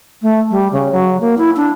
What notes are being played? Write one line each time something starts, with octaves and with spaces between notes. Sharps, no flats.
A3
G3
C#3
F#3
A#3
E4
D4